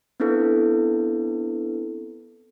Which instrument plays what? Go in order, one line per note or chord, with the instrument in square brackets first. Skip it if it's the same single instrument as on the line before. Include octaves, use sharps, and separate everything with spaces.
[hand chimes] B3 C4 D4 E4 A4 B4